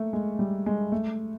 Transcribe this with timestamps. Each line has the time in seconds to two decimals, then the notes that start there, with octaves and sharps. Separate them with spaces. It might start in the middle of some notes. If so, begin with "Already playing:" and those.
Already playing: A3 A#3
0.13 G#3
0.39 G3
0.66 G#3
0.92 A3